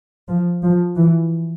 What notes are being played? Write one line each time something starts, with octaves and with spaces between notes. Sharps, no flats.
F3
F3
E3